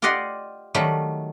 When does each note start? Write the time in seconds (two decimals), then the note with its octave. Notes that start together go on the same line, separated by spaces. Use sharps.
0.02 F4 G4 D5 D#5 F#5 C6
0.74 D#3 F#3 G3 A3